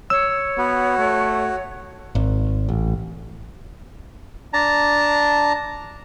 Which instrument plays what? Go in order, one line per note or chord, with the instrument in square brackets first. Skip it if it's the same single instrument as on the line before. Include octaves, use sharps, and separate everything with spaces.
[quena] C#5 [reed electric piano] E6
[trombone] B3 [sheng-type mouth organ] F#4
[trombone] A3
[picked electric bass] G#1
A1
[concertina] D4 A5 A#5